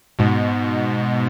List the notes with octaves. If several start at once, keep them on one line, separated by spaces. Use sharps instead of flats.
G#2 B2